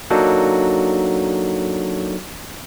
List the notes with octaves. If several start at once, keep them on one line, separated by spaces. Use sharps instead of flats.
F#3 A#3 D4 D#4 F#4 A4